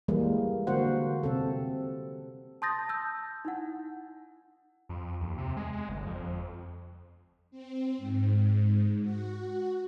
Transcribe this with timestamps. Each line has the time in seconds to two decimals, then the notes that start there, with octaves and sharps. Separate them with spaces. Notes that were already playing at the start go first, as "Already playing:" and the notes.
0.08 E3 G3 G#3 A#3
0.67 D3 A#3 F#4 C5 F#5
1.23 C3 C4 A4
2.62 A5 C6 D#6 G6 A6 A#6
2.89 A5 E6 G6
3.45 D#4 E4 F#5
4.89 F2
5.20 D#2
5.38 C3
5.57 G#3
5.73 G#3
5.89 G1
6.06 F2
7.51 C4
7.98 G#2
9.01 F#4